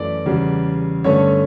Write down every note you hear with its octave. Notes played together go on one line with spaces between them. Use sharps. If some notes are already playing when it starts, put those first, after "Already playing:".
Already playing: F#2 E3 A3 D5
E2 C#3 G3
G2 D3 A3 C#4 C#5